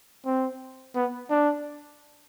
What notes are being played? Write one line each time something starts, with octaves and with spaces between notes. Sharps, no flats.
C4
B3
D4